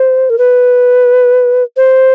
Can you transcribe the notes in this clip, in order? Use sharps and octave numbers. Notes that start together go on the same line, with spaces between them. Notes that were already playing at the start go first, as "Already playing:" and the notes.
Already playing: C5
A#4
B4
C5